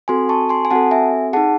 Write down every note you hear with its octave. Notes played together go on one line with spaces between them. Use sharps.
C4 F#4 A4 G#5 C6
A5 C#6
G#5 C6
G#5
C4 F#4 A4 F#5 A5
E5 G#5
D#4 G#4 F#5 A5